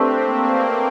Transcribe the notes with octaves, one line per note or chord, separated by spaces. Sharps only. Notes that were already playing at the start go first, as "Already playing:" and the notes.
Already playing: A3 C4 D4 G4 B4
A#3